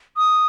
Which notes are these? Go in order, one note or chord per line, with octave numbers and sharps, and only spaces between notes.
D#6